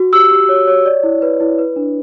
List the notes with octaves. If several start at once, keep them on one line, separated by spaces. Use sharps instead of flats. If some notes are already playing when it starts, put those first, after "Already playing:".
Already playing: F#4
G4 E6
G4
C#5
C#5
D5
E4
B4
E4
B4
D4